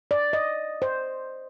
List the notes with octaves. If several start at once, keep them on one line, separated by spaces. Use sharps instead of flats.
D5
D#5
C5